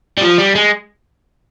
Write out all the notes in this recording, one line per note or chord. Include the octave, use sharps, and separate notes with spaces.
G3
F3
G3
G#3